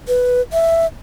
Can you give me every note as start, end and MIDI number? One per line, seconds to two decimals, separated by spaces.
0.08 0.41 71
0.53 0.86 76